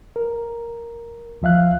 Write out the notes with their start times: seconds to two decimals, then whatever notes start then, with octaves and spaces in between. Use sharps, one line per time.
0.16 A#4
1.42 D2 F3 E5 F5 F#6